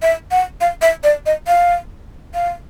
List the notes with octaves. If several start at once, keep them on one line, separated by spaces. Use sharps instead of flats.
E5
F#5
F5
E5
D5
D#5
F5
F5